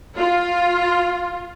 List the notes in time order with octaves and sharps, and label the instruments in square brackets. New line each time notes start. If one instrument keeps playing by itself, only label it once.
[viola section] F4